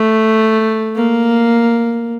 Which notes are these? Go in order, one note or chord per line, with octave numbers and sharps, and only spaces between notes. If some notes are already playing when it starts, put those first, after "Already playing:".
Already playing: A3
A#3